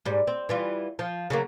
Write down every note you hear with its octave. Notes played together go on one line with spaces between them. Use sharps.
G#2 G3
C4
E3 G3 F4
F3
C#3 F#3 A#3